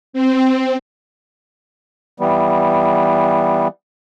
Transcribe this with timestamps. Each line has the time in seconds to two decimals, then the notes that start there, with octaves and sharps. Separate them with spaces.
0.13 C4
2.20 E3 G3 B3